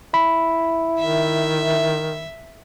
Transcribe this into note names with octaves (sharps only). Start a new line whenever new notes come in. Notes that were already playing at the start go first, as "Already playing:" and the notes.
E4 B5
D#3 E5